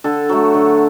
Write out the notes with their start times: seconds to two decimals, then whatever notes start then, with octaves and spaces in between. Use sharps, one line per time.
0.04 D3 A4
0.29 F#3 A3
0.54 D3